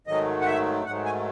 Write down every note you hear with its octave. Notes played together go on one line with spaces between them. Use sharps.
G#2 D#3 F#3 A3 D#5
F#5
E5
G#2 D#3 F#3 A3 F#5
G#5